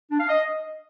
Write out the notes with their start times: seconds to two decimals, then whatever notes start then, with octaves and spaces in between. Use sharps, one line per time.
0.11 D4
0.20 F5
0.29 D#5